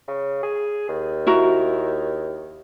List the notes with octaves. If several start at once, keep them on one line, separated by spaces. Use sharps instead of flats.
C#3
G#4
D#2
E4 F#4 A#4